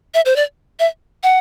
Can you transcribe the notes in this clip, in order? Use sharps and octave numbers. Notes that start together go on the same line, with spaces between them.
E5
C5
D5
E5
F#5